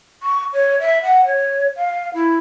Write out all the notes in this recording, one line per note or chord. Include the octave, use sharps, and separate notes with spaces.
C#6
C#5
E5
F#5
C#5
F5
E4